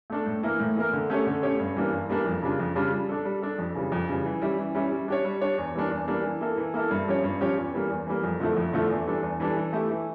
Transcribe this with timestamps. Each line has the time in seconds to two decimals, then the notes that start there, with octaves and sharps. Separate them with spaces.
0.10 A3 D4 A4
0.26 A2
0.43 E3 A#3 E4 A#4
0.60 A2
0.76 E3 A#3 E4 A#4
0.93 D3
1.10 A3 C#4 G4 C#5
1.27 D3
1.43 A3 C#4 G4 C#5
1.60 G2
1.76 E3 G3 A#3 D4
1.93 G2
2.10 E3 G3 A#3 D4
2.26 F2
2.43 C#3 G3 D4 F4
2.59 F2
2.75 C#3 G3 D4 F4
2.92 G3
3.09 D4 A4
3.25 G3
3.42 D4 A4
3.59 F2
3.75 C#3 E3 G3
3.92 F2
4.08 C#3 E3 G3
4.25 E3
4.42 G3 C#4 E4 G4
4.58 E3
4.75 G3 C#4 E4 G4
4.92 G3
5.08 D4 G4 C#5
5.25 G3
5.41 D4 G4 C#5
5.58 E2
5.75 E3 G3 A#3 D4
5.91 E2
6.08 E3 G3 A#3 D4
6.24 E3
6.41 A#3 E4 A4
6.57 E3
6.74 A#3 E4 A4
6.91 G2
7.07 F3 C#4 G4 C#5
7.24 G2
7.41 F3 C#4 G4 C#5
7.57 E2
7.74 E3 G3 A#3
7.90 E2
8.07 E3 G3 A#3
8.23 F2
8.40 D3 F3 A3 E4
8.57 F2
8.73 D3 F3 A3 E4
8.90 E2
9.06 E3 G3 D4 A4
9.23 E2
9.40 E3 G3 D4 A4
9.56 E3
9.73 A3 E4 G4
9.90 E3